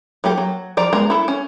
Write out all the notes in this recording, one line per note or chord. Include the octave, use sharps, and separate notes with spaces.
F#3 A#3 G4 A4
F#3
F3 D5 A#5
G#3 B3 A#4 A#5
E4 A4
C#4